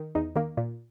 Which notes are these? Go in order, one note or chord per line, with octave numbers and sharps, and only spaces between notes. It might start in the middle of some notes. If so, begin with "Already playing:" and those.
Already playing: D#3
E2 D#4
D#3 A#3
A#2